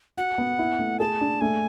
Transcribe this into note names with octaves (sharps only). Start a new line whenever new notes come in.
F#4 F#5
B3
E4
A3
G#4 A5
D4
A3 G#5